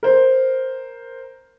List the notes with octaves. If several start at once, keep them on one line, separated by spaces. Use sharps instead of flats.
A#4 C5